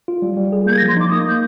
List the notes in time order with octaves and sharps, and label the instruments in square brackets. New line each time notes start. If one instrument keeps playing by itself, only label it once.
[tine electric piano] F4
G3
G3
G#4
[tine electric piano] A#3 [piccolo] G6
[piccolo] G#6
A#6
[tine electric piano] F3
[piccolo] C6
[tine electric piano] D#4 [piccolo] D6
[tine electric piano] A#3 [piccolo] D#6
[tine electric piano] A#3 [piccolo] G6